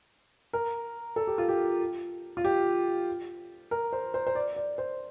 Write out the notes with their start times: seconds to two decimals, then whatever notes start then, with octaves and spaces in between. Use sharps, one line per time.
0.53 A#4
1.16 A4
1.27 G4
1.38 F4
1.49 G4
2.37 F4
2.44 G4
3.71 A#4
3.93 C5
4.14 C5
4.27 C5
4.35 D5
4.56 D5
4.78 C5